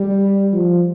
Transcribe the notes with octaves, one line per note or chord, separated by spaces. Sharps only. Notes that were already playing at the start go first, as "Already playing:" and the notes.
Already playing: G3
F3